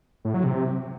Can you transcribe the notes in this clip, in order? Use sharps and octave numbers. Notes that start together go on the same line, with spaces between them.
A2
F#3
C3